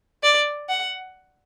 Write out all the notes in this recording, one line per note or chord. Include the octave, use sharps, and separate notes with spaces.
D5
F#5